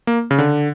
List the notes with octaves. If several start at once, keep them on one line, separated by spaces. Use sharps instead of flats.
A#3
C#3
D3